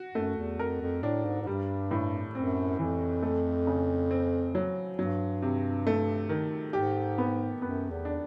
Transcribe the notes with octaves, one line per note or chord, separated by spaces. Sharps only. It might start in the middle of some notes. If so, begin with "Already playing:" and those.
Already playing: F#4
F#2 A3
E2
F2 A#4
F2
A2 D4
G#2
G#2
G2 G3
A2
F#2 C4
F2 E3
A3
C#3
C4
F#3
G2 F#3
C3
A3
D#3
G#2 G4
B3
F#2 B3
E2
D4